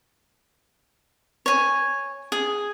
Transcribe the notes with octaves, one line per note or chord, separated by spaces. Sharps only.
C#5 G#5
G#4